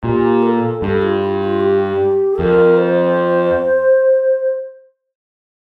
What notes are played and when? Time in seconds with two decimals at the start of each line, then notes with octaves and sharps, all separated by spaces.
0.03 A#2 G4
0.42 A#4
0.46 A4
0.82 G2 A4
1.02 F4
1.21 F4
1.40 F4
1.60 G4
2.39 F2 A#4
2.77 C5